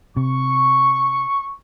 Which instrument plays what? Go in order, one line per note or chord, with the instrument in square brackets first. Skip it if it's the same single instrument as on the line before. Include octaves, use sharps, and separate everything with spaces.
[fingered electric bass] C3 [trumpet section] C#6